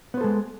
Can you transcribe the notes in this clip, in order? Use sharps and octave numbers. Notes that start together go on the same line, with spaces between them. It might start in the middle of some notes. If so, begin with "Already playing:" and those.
G#3 B3 A4 C5